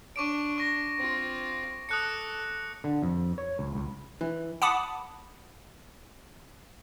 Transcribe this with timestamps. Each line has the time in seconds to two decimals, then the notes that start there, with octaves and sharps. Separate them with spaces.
0.16 D4 C#6 D6 D7
0.58 C#6 A#6
0.98 C4 F4
1.89 A4 D#6 F#6 C#7
2.84 D3
3.03 F2
3.38 C#5
3.59 C#2
3.75 C#2
4.21 E3
4.62 F#5 A5 B5 D6 D#6